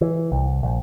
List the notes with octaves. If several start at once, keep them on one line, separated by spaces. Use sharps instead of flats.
E3
C2
A#1